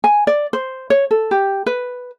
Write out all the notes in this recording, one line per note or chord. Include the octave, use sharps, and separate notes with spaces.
G#5
D5
C5
C#5
A4
G4
B4